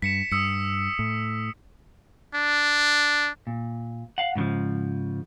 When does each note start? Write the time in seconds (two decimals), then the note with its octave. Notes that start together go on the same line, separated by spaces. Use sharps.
0.02 G2 B6 C#7 E7
0.32 G2 D#6 E6 C#7
0.99 A2
2.34 D4
3.47 A#2
4.18 F5 F#5
4.36 G#2 C#3 E3 F3